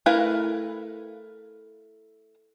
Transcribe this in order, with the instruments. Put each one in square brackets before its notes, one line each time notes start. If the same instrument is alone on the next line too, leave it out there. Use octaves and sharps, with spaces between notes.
[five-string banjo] A3 E4 A#4 B4 F5